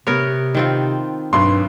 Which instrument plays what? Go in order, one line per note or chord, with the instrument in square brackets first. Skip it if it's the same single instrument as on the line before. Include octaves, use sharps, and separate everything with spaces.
[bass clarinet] C3 [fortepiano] B3 [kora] A#4 C#5
[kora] D#3 C4 F4
[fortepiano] B1 B2 [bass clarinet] G2 [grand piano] C6